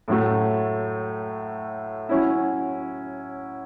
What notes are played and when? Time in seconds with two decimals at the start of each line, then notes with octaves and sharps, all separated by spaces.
0.08 A2 F#3 A3
2.09 F#3 C#4 E4